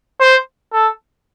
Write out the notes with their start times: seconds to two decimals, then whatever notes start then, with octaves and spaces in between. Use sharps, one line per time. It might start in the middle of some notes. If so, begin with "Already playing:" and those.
0.21 C5
0.73 A4